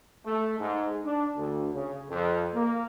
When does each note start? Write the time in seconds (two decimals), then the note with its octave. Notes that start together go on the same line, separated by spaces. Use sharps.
0.25 A3
0.59 G#2
1.03 D4
1.35 D2
1.74 C#3
2.10 F2
2.53 A#3